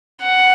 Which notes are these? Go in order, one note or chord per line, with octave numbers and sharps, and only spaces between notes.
F#5